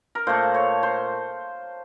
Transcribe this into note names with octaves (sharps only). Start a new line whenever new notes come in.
A#4
A#2 A3 C5
C#5
C5